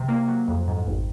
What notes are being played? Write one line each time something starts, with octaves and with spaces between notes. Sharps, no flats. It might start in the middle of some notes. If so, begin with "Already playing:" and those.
Already playing: C3
A#3
F#3
F2
G#2
G#1